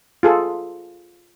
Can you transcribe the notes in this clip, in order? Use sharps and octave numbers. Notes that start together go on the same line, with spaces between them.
F4 G#4 A4